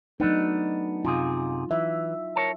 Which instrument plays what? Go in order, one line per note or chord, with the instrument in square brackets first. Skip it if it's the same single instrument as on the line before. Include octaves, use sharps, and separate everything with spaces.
[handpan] F#3 D#4 [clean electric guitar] A3 B3 D4
[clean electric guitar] F#2 C3 G#4 [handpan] F4
[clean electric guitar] E3 [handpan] E5
[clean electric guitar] A#4 C#5 A5